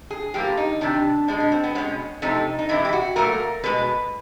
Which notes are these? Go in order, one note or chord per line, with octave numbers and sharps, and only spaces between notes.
G#4
A2 F3 A#3 G4
D#4
C3 D#3 G3 D4
B2 G#3 D4
C#4
C4
B3
B2 G#3 C#4
C3 F3 A3 D#4
D#4
C3 E3 G#3 E4
G4
F#4
A#2 F#3 A3 A#4
B2 G#3 B4